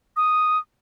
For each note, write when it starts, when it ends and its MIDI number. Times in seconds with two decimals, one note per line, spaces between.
0.17 0.58 87